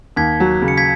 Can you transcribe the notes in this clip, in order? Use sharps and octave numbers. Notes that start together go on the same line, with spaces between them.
D#2 G#6 B6
F#3
C#3
C#7
G#6 B6